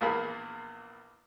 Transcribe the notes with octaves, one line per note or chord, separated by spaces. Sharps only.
A#1 E2 A#2 A#3 G#4 B5